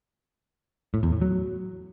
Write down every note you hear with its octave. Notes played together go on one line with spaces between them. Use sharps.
A2
E2
A2
F#3